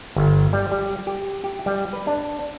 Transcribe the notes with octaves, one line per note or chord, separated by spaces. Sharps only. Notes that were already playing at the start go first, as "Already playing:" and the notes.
G1
G3
G3
G4
G4
G3
B4
D4